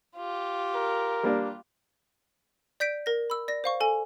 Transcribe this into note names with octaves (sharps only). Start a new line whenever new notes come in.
F4 G4
A#4
G3 A#3 D4
D5 G6 B6 D7
A#4 A#6
B5 E6
D5 A#6
C5 F5 C#6
A4 G#5